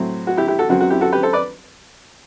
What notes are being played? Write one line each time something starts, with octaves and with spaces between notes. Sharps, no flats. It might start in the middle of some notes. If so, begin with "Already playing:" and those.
Already playing: A2 F#3 C4
F#4
E4 G4
E4 G4
F#4 A4
F#2 F#3 C4 F#4
F#4
E4 G4
F#4 A4
G4 B4
A4 C5
B4 D5